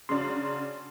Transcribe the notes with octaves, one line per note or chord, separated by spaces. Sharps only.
C#3 F#3 D4 C6